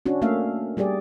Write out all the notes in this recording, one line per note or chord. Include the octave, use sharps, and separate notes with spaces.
C#4 D4 F#4
A3 A#3 C#4 E5 F5
G3 G4 G#4 D5